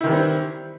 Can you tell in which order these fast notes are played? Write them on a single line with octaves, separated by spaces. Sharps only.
E4 D#3 E3 G3 C4